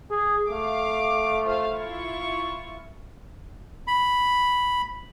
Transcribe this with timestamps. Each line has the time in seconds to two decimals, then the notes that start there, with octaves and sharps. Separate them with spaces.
0.10 G#4
0.50 A3 F5 D6
1.45 F4 C5 F5
1.74 E4 F4 C#6
3.87 B5